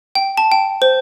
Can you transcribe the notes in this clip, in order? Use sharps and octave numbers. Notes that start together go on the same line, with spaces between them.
G5
A5
G5
C5